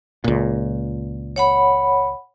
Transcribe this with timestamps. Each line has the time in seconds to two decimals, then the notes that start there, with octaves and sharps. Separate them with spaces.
0.24 C#2 A#2
1.36 C#5 F#5 B5